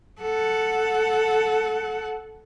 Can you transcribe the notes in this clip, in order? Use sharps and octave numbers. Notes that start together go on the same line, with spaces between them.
A4 F#5